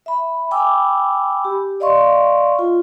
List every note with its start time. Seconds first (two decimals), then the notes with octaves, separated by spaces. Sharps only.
0.06 E5 B5
0.51 G5 G#5 B5 D6 E6
1.45 G4
1.80 D5 D#5 F5 C6 C#6
2.59 F4